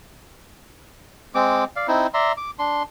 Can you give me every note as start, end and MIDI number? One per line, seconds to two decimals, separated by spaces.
1.35 1.64 56
1.35 1.64 60
1.35 1.64 86
1.76 1.87 74
1.76 1.87 77
1.88 2.07 60
1.88 2.07 63
1.88 2.07 64
2.14 2.32 74
2.14 2.32 76
2.14 2.32 82
2.14 2.32 84
2.37 2.51 86
2.59 2.83 62
2.59 2.83 84